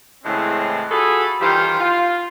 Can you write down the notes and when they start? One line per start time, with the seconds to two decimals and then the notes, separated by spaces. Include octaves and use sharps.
0.24 A2 C#3 E3 G#3 C4 C#4
0.91 F4 F#4 G#4 A4 G#5 B5
1.41 D#3 E3 G3 F4 C5
1.79 F4